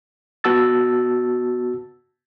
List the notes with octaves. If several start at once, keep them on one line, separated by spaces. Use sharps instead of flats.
B3 F#4 A5 E6 A6